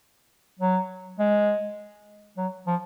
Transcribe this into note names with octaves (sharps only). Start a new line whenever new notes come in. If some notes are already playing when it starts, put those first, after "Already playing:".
F#3
G#3
F#3
F3